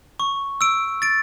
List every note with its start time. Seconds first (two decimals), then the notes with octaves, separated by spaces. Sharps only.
0.20 C#6
0.61 E6 D7
1.02 A6 D7